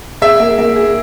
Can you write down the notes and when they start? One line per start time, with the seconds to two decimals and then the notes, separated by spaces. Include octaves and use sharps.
0.22 G#4 E5
0.40 A#3
0.58 A#3
0.76 G#4